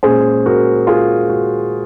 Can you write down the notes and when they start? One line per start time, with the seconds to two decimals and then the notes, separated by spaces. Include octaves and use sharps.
0.03 A#2 G#3 C#4 G#4 C5
0.46 F#4 A#4
0.87 F4 G#4
1.30 F#4